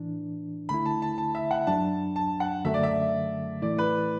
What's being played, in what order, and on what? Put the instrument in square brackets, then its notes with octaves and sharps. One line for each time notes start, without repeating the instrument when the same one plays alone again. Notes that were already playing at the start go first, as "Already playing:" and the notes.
Already playing: [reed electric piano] A2 E3 D4
[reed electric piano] D3 A3 E4 [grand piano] B5
[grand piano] A5
A5
A5
E5
F#5
[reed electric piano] F#2 F#3 D4 [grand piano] A5
[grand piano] A5
F#5
[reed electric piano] F#2 D3 F#3 A3 [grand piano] E5
[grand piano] D5
E5
[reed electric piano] A2 E3 A3 E4 [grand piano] D5
[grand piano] B4